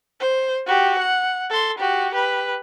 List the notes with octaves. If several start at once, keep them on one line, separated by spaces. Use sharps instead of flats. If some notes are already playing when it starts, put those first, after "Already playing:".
C5
F#4 G4
F#5
A4 C6
F#4 G4
G4 B4